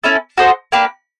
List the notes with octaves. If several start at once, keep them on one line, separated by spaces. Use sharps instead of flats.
C#4 E4 A4
F#4 A4 C5 D#5
A#3 D4 G4 B4